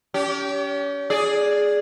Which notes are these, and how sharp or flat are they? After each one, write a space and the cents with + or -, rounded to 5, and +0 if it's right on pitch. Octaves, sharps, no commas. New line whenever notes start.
C#4 +40 G4 -15
G#4 +0 D5 +0